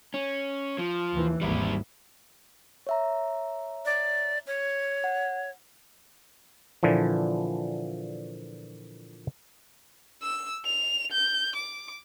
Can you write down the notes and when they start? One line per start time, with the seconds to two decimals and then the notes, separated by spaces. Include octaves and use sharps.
0.14 C#4
0.78 F3
1.13 D#2 E3
1.41 G#1 D#2 G3 E4
2.87 C#5 E5 A#5
3.85 D5
4.47 C#5
5.04 F#5
6.83 A#2 D3 E3 F3
10.23 E6
10.66 F7
11.12 G6
11.56 D6